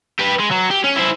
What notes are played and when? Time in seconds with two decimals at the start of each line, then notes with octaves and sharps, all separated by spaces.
0.19 G4 B4
0.40 G#3
0.52 F#3
0.71 G4
0.84 C#4
0.96 E4 C5